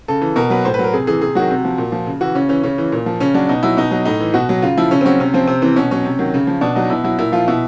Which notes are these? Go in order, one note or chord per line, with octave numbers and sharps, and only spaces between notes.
C#3 A4
E3
B2 A#4
F#3 B4
A2 C5
B4
F#3
A#4
C3 G#4
E3 G#4
C3 G#4
D#3 F#3 F#4
C3
F3
A#2
F3
C#3
E3 F#4
C#3 C#4
E3 C#4
C#3 C#4
E3
A#2
F3
C#3 C#4
F#3 D4
B2 D#4
F#3 E4
B2 D#4
F#3
A2 D#4
E3
B2 F#4
F#3
C#3 F4
F3 E4
C#3 C#4
C4
F#3 C#4
C3 C#4
F3 C4
C3 C4
E3 C4
B2 C#4
F#3 C#4
C3
D#3 F#3
C#3
F3
B2 D4
F#3 D#4
B2 E4
F#3 E4
A#2 E4
F3 F4
B2 E4